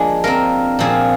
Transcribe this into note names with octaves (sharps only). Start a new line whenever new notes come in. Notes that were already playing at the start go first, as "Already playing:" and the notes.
Already playing: F3 G#3 A#3 D4 G#4
C4 F4 A#4
A#2 F3 C4 F4 G#4